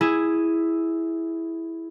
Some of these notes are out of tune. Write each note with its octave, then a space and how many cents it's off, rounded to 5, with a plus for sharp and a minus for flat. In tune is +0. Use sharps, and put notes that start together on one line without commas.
E4 +0 G#4 +0